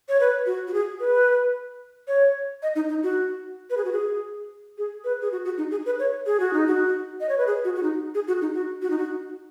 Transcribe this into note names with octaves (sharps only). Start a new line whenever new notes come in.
C#5
B4
F#4
F#4
G#4
B4
C#5
D#5
D#4
D#4
F#4
B4
G#4
F#4
G#4
G#4
B4
G#4
F#4
F#4
D#4
G#4
B4
C#5
G#4
F#4
D#4
F#4
D#5
C#5
B4
G#4
F#4
F#4
D#4
G#4
F#4
D#4
F#4
F#4
D#4
F#4